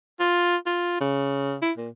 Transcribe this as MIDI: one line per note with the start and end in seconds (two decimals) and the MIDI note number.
0.20 0.57 65
0.66 1.00 65
1.01 1.57 49
1.62 1.72 64
1.77 1.89 46